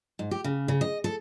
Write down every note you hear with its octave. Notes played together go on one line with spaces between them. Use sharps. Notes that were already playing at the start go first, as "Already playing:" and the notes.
G#2
G4
C#3
C#3
D#5
A4